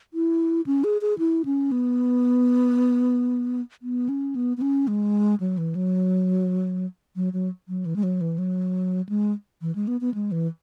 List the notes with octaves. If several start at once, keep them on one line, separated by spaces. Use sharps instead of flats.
E4
C#4
G#4
G#4
E4
C#4
B3
B3
C#4
B3
B3
C#4
G#3
F#3
E3
F#3
F#3
F#3
F#3
E3
G#3
F#3
E3
F#3
G#3
E3
G#3
B3
B3
G#3
E3